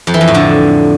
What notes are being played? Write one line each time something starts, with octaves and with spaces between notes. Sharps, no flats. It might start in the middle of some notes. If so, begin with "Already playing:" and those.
F2
E3
F2
A2
D3